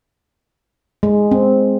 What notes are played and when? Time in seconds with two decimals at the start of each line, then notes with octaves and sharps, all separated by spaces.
1.03 G#3
1.31 C4